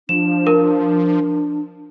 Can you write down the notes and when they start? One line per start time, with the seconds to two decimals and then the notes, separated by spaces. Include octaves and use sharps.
0.09 F3 D4 E7
0.47 A#4